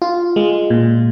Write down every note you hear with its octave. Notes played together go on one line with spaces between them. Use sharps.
F4
G#3
A#2